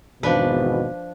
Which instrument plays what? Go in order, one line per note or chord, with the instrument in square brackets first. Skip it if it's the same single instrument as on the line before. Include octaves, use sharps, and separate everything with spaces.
[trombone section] G#1 E2 B2 [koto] F3 D4 B4